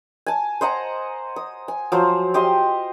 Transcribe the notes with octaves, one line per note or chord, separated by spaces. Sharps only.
G#5 A5
C5 D#5 F#5 A#5
D#6
G#5
F3 F#3 C5
G4 D#5 C6